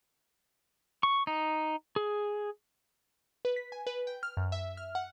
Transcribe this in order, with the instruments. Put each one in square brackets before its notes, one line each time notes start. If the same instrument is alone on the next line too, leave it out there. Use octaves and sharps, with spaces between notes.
[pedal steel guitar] C#6
D#4
G#4
[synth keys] B4
B6
G#5
B4
G5
F6
F#2
E5
F6
F#5